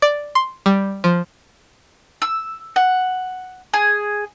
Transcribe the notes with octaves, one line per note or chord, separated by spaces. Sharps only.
D5
C6
G3
F3
E6
F#5
G#4